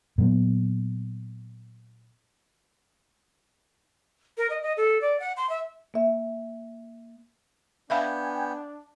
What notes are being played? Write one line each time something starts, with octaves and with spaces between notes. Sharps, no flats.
A#2 F#3 B3
A#4
D#5
D#5
A4
D5
F#5
C6
E5
A#3 E5
B3 D4 E5 F5 G5 G#5 B5